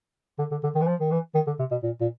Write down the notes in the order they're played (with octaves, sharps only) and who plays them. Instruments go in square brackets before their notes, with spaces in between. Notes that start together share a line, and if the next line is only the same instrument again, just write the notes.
[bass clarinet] D3
D3
D3
D#3
E3
F3
D#3
E3
D#3
D3
C3
B2
A#2
A#2